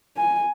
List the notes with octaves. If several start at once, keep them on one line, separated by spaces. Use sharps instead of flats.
G#5